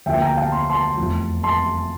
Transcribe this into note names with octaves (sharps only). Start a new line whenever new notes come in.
D2 D3 F3 A#3 E5 G5
G5 A#5
F5 A5
C6
A5 C6
F1 E2 C3 F3 A3
A5 C6